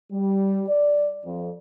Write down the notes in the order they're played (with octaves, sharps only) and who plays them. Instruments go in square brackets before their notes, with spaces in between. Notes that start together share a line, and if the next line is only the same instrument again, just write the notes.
[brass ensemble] G3
D5
F2